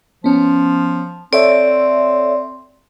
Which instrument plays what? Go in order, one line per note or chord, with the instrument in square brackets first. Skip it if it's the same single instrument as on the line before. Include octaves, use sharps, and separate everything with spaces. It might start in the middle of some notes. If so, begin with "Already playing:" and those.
[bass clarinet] F3 [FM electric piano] B3 C#4
[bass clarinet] C4 [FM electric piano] A4 C#5 E5 [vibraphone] D5